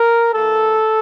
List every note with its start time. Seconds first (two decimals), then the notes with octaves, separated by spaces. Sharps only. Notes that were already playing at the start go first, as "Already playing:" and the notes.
Already playing: A#4
0.33 E3 A#3 A4